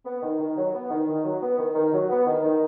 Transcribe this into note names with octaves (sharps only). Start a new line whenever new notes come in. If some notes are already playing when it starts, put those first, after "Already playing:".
B3
D#3
D#3
F#3
B3
D#3
D#3
F#3
B3
D#3
D#3
F#3
B3
D#3
D#3